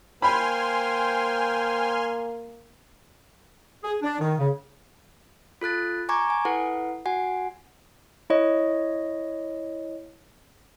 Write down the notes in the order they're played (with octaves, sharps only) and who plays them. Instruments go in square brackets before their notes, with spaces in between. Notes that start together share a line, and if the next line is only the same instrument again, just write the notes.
[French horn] A#3 [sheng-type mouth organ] C5 G5 [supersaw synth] G#5 C6 F6 [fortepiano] B5
[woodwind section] G#4
D4
D#3
C#3
[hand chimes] F4 A4 F#6 A6
G#5 A#5 C#6 D6 G#6
G#5
E4 A4 B4 F#5
F#4 F#5 G#5
[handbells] E4 C#5 D#5